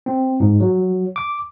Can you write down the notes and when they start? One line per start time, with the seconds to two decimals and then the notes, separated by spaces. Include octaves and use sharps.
0.06 C4
0.40 G#2
0.60 F#3
1.16 D6